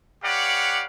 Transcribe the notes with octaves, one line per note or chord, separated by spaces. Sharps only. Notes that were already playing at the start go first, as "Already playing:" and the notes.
G4 B4 C#5 D5 F5 F#5